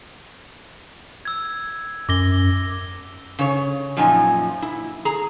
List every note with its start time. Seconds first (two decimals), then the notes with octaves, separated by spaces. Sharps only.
1.25 E6 G#6
2.09 F#2 D6 A#6 G7
3.39 C#3 C#5
3.97 F#2 A#2 F3 D#4 G#5
4.62 E4
5.05 G#4 A#5